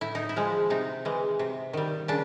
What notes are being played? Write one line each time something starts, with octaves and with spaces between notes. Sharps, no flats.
A2 E4
D#4
E4
F3 G#3
C3 D#4
E3 G#3
C3
D#3 G3
C#3 D4